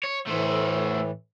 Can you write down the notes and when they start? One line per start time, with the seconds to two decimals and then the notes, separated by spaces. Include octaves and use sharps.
0.04 C#5
0.27 A2 E3 A3 C5